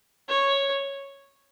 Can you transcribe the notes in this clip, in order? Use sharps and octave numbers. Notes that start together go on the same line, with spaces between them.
C#5